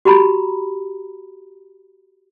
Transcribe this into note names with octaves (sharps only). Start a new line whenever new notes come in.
F#4 G4 A#5 B5